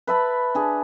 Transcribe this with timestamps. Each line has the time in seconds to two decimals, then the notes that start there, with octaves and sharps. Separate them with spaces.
0.07 B4 E5 A5 B5
0.55 D4 G#4